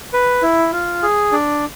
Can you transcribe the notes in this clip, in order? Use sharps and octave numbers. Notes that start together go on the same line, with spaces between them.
B4
E4
F4
G#4
D4